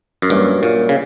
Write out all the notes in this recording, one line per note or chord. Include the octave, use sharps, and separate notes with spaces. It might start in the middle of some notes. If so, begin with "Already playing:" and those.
F#2
G2 F#3 A#3 C#4 E4
A#2
C#3